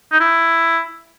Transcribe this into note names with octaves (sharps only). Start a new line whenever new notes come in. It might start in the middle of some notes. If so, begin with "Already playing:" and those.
D#4
E4